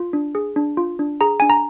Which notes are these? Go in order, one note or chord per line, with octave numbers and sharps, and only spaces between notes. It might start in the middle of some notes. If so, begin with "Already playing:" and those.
Already playing: F4
D4
G#4
D4
F4
D4
G#4 A#5
D4 G#5
A#5